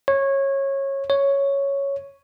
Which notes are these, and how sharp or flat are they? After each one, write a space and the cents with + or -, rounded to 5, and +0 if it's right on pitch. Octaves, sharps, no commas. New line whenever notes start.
C#5 -20
C#5 +0